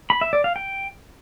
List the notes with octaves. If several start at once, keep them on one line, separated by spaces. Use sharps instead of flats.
B5
E5
D5
F5
G5